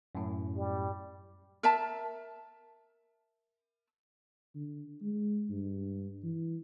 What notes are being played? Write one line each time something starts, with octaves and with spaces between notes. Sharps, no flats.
F#2 A2
G3
A#4 E5 A5
D3
G#3
G2
E3